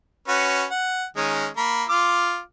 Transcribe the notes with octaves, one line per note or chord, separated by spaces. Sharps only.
C#4 F#4 B4
F#5
D#3 G#3 C#4
A#3 B5
F4 D6 F6